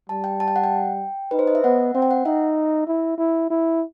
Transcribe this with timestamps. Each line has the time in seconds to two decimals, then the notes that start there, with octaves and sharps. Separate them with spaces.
0.09 G3 A5
0.24 G5
0.40 A5
0.48 G5
0.56 F#5
0.64 G5
1.31 D#4 B4
1.39 C5
1.47 D#5
1.55 E5
1.64 B3 F#5
1.95 C4 F#5
2.02 G5
2.11 F#5
2.25 D#4 E5
2.88 E4
3.18 E4
3.50 E4